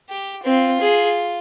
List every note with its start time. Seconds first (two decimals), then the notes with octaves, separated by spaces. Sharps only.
0.09 G4
0.45 C4 F4
0.80 G#4